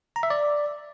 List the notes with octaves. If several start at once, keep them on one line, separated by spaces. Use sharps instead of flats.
A#5
E5
D5